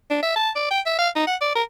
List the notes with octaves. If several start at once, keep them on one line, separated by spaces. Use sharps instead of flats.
D4
E5
A5
D5
G5
E5
F5
D#4
F#5
D5
A#4